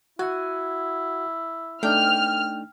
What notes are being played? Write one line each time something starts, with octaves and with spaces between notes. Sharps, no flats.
E4 F#4 F#5 G#5
A3 D4 D#4 G5 F6